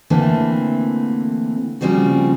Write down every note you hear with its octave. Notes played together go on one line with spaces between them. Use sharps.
D3 E3 A3 A#3 C4
A#2 C#3 F3 G3 C4 F#4